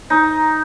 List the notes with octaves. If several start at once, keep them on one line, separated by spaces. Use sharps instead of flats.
D#4